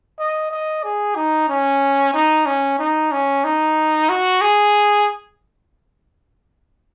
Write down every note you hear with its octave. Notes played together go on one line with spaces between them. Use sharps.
D#5
D#5
G#4
D#4
C#4
D#4
C#4
D#4
C#4
D#4
F#4
G#4